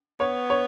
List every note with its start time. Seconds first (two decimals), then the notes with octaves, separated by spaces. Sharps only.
0.20 B3 C#5
0.50 C#5